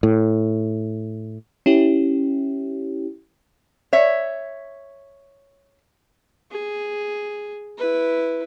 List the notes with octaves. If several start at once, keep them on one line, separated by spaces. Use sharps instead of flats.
A2
C#4 E4 G4
C#5 E5
G#4
E4 B4